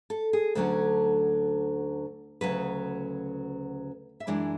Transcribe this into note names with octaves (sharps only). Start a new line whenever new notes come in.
A4
G#4
D2 D3 F#3 C#4 A4
D2 C#3 F#3 B4
E5
F#2 E3 G#3 D4 D5